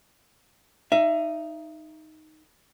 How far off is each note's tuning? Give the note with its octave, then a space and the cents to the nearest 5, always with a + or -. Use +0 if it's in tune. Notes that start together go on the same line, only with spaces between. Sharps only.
D#4 +0 E5 +30